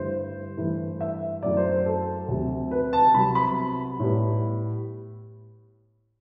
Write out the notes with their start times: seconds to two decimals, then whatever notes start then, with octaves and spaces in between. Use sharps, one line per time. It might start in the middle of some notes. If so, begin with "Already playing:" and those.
Already playing: G2 D3 A3 E4 C5
0.57 G2 E3 A3 E4
1.01 E5
1.43 F#2 F#3 A3 E4 D5
1.57 C5
1.71 C5
1.86 A4
2.28 D2 C3 F#3
2.71 B4
2.93 A5
3.14 C2 C3 F#3 B3 B5
3.35 B5
4.00 A2 G3 B3